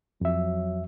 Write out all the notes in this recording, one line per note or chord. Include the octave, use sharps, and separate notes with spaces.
F2 F#3 E5